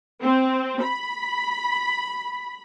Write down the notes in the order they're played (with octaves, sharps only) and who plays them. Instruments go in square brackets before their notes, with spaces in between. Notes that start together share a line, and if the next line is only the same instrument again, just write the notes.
[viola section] C4
B5